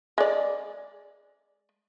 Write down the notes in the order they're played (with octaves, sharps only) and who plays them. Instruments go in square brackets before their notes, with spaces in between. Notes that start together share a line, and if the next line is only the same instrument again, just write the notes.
[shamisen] G#3 D5